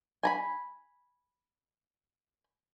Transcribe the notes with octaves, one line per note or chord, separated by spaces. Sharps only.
G#5 A#5 B5